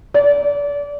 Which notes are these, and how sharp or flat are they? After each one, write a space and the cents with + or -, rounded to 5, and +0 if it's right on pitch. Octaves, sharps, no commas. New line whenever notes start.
D5 -30